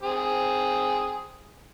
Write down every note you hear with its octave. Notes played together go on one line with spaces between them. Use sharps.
C4 G#4